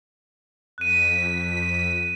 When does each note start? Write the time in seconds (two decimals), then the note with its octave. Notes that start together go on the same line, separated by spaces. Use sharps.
0.78 F2 F#6 B6 D#7